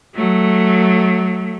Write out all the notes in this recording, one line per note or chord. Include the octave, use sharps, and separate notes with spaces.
F#3 A3